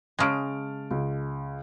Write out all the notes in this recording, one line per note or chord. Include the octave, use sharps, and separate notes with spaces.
C#3 G#3 A5 F6 D7
C#2